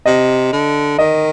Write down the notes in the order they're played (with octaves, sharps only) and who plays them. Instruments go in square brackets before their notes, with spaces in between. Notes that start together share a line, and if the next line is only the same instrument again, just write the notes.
[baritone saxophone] C3 [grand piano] D#5
[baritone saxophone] D3
[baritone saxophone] D#3 [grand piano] D#5